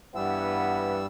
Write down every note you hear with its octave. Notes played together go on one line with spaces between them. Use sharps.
G2 E3 G3 B3 E6